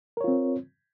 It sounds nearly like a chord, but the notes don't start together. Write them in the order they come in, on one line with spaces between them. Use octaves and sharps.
A#4 C#5 F4 C4